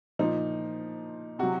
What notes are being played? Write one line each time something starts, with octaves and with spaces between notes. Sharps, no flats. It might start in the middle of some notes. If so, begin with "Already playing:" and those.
A#2 F3 D#4
C3 F#3 F#4